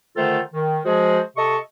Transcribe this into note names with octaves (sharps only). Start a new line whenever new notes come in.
D3 D#3 A3 F4 A4 C5
D#3
F3 G#3 F#4 G#4 C5
C3 A4 D#5 C#6